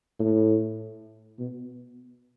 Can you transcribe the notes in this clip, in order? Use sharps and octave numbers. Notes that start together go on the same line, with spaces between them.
A2
B2